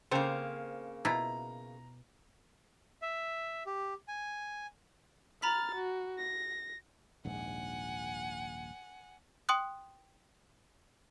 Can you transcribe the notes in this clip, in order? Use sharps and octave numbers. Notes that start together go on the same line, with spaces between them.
C#3 A#3 C4 C#4 A4 C5
B2 E4 F4 A#5
E5
G4
G#5
A#5 B5 F6 A6 B6
F#4
A#6
D#1 A#1 G#2 F#5 G#5
G5 C6 D#6 F#6